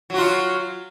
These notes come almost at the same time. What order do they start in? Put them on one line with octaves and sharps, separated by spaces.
F#3 F#4 F4